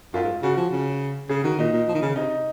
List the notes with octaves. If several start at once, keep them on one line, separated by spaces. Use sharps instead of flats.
F#2 F4
G#2
C#3 F#4
F3
C#3
C#3 G#4
D#3 F#4
A#2 D#4
A#2
F3
D#3
C#3
C3 D#4